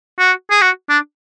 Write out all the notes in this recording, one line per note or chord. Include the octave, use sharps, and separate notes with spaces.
F#4
G#4
F#4
D4